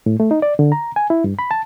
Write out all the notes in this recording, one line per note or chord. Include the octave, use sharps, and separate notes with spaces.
A2
A3
D#4
D5
D3
A#5
G#5
E4
G2
B5
A5